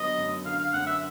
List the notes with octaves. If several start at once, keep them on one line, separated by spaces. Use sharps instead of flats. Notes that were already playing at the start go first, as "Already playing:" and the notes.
Already playing: D3 F#3 B3 D#5
F#2
D3 F5
F5
F#2 F#5
E5